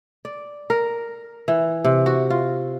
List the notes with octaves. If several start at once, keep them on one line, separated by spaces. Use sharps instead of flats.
D5
A#4
E3
C3
F#4
F4